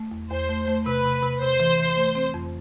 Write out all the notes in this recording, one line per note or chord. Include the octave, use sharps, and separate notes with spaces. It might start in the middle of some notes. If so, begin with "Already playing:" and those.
Already playing: A3
E2
E2 C5
A3
A3
C3 B4
C3
C3
C3 C5
E3
E3
A3
C4
F2